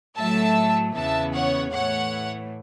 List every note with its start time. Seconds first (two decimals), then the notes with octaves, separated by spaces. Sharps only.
0.16 A2 F#3 A3 E5 A5
0.95 E2 C#3 E3 B3 E5 A5
1.34 C#5 F#5
1.73 A2 E3 A3 C#5 F#5